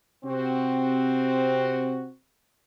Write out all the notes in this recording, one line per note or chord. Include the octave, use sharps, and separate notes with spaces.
C3 C4 F#4